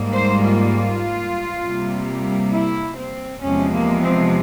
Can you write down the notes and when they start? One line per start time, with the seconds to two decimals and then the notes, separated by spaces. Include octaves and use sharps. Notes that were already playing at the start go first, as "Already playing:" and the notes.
Already playing: G#2 G3 A#3
0.14 C5
0.44 F4
1.64 C3 G3 A#3
2.54 E4
2.99 C4
3.44 E2 C3 F3 G#3 C#4
3.74 A#3
4.04 C4